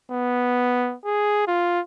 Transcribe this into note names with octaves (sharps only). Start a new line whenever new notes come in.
B3
G#4
F4